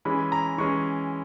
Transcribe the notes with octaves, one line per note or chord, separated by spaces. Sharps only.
E3 G#3 C#4 B5
A#5
E3 G#3 C#4 C#6